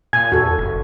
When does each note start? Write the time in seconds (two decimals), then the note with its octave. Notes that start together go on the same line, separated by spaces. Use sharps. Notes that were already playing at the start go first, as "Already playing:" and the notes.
0.13 A#2 G#5 G#6
0.32 E2 F#4 A4
0.58 F#1